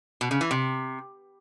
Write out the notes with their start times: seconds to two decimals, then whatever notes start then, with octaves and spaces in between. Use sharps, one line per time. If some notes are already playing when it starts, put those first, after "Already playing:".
0.21 B2
0.31 C#3
0.41 E3
0.51 C3